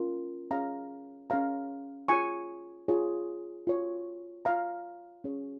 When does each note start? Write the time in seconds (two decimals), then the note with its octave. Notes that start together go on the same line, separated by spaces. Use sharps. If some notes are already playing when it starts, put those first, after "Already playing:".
Already playing: C#4 F4 A#4
0.51 C#4 G#4 C#5 F5 A#5
1.30 C#4 G#4 C#5 F5 A#5
2.08 F4 G#4 C#5 G#5 C#6
2.88 F4 G#4 C#5
3.67 F4 C#5
4.45 F4 C#5 F5 A#5
5.24 C#4 G#4 C#5